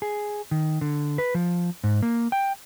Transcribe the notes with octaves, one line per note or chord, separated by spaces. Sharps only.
G#4
D#3
D3
B4
F3
G#2
A#3
G5